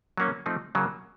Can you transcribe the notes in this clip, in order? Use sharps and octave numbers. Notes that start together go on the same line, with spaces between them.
F#3 A#3 C#4
F3 A3 C4 D#4
C#3 F#3 A#3